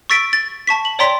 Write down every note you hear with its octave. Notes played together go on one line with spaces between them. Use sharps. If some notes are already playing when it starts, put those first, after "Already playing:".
C#6 E6 A6 B6 D7
A6
A5 C#6 B6
F#7
C#5 D5 G5 A#5 C6 B6